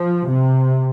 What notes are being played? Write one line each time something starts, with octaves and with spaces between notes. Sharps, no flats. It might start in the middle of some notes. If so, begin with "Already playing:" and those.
Already playing: F3
C3